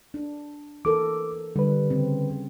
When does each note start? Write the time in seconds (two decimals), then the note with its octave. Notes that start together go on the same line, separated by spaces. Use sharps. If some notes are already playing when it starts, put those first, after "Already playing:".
0.14 D4
0.85 E3 A4 A#4 D6
1.56 D3 G3 B4
1.90 C#3 C4